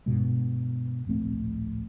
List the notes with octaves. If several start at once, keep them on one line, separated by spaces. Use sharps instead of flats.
G2 B2 G#3
D1 A#1 A3 C4